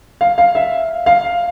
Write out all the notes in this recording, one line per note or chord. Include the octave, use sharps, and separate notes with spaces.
F5
F5
E5
F5